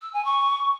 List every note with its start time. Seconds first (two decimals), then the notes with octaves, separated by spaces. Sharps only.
0.02 E6
0.13 G#5
0.25 C#6